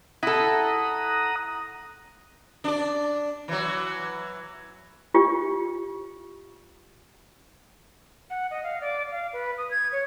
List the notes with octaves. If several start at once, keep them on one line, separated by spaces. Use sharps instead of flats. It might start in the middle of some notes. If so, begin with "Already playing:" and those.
E4 A4 F#5 A#5 D#6
D4 D5
E3 F#3
F4 G4
F#5
D#5
F5
D5
F5
B4
D#6
G#6
C#5